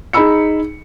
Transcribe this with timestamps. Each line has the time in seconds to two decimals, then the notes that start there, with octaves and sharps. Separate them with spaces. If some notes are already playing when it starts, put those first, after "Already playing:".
0.13 D#4 G#4 B5 E6 C#7